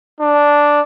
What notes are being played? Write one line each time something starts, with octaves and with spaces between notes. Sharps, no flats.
D4